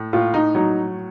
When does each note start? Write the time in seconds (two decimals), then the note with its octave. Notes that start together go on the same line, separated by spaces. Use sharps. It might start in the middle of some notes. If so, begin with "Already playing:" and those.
Already playing: A2
0.13 A2 F4
0.34 D#4
0.55 F#3 D#4